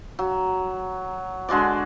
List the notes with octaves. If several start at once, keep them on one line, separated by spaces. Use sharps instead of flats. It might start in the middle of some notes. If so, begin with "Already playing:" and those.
F#3
D3 G#3 F#4 D5